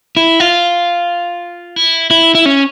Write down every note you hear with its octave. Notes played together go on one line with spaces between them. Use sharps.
E4
F4
E4
E4
E4
C#4